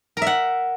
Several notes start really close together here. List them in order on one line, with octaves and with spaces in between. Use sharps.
A#4 E5 F#5